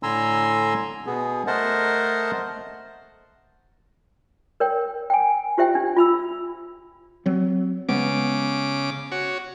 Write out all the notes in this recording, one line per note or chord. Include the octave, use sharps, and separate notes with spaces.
A2 D3 G#5 A#5 C6 E6
B2 B3 G#4
A3 A#4 C5 D#5 F#5 A5
A#4 C#5 G5
G5 G#5
F4 G4 C5 E5 G5
D4
F4 B5 E6
F#3 C4
C#3 G#3 B3 D6
F#4 C#5